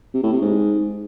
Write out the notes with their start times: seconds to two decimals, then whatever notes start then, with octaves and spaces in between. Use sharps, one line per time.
0.14 C3
0.23 A2
0.33 C3
0.42 G#2